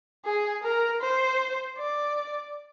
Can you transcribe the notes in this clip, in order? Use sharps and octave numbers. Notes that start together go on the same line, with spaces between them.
G#4
A#4
C5
D5